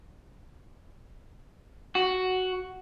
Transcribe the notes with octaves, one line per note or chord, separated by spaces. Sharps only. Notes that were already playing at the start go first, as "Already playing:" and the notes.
F#4